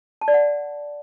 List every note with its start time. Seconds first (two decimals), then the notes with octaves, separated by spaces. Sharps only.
0.21 A5
0.28 D5
0.34 F#5